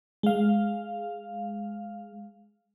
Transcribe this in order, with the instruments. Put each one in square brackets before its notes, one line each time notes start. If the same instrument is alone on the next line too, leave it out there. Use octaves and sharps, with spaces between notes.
[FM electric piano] G#3 F5